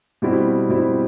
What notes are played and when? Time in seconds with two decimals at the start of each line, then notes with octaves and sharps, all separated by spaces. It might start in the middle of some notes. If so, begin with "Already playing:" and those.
0.22 B2 G3 C4 E4
0.69 B2 G3 C4 E4